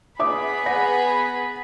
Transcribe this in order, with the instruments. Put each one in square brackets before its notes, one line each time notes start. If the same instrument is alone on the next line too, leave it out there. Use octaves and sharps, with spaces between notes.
[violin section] B3 G#4 B5 [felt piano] E5 D6 D#6
[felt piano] F#5 A#6